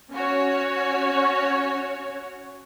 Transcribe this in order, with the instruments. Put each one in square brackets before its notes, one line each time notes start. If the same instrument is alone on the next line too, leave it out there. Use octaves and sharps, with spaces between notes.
[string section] C#4 F#4 C#5